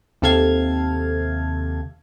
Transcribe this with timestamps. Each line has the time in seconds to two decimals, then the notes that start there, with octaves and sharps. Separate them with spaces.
0.22 D#2 C3 A4 F5 G#6